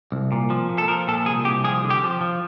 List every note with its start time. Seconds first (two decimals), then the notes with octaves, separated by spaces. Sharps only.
0.12 C2
0.32 A#2
0.50 F3
0.69 A#2
0.78 A4
0.88 F3 A#4
1.08 A#2 A4
1.26 C2 G#4
1.45 C2 G4
1.64 F3 G#4
1.84 D3
1.90 G4
2.03 F3
2.21 F3